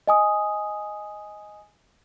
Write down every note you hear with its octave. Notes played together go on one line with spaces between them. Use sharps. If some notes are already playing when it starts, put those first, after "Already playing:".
D#5 G#5 D#6